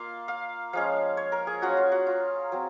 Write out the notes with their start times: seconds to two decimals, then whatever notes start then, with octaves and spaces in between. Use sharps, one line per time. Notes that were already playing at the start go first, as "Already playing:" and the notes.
Already playing: A#3 F4 F5
0.28 F5
0.73 F3 G#3 C#4 F5
1.17 C#5
1.32 A#4
1.47 G#4
1.62 F#3 C#4 F4 F#4
1.77 F4
1.92 F#4
2.07 F4
2.52 F#3 C4